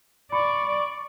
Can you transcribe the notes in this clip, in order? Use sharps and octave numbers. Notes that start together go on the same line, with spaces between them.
D5 B5 C#6